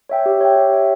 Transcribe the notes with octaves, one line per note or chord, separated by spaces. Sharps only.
C#5 E5 G5
G4
C#5 E5 G5
G4
C#5 E5 G5